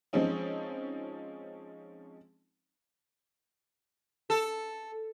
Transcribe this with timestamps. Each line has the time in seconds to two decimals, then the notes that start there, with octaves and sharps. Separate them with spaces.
0.13 F3 G#3 C4 C#4 D#4
4.30 A4